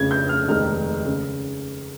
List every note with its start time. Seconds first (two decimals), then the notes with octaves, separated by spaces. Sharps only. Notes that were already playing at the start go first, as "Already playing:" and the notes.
Already playing: F1 F2 C#3 G#6
0.11 G6
0.29 F6
0.48 F1 D#2 D#3 G#3 D#4 F6
1.05 C#3